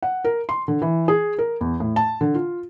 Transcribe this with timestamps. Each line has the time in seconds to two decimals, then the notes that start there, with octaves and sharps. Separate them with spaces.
0.03 F#5
0.25 A#4
0.49 C6
0.68 D3
0.82 E3
1.08 G#4
1.38 A#4
1.61 E2
1.80 A2
1.96 A5
2.21 D3
2.34 F4